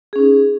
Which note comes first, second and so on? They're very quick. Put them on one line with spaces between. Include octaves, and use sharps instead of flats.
G#4 C#4 D#4